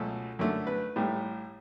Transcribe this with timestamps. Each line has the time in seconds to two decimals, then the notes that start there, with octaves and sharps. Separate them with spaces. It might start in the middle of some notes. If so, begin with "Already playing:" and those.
Already playing: C#2 B2 F#3 A3 A4
0.39 F#2 D3 A3
0.67 B4
0.96 A1 A2 G3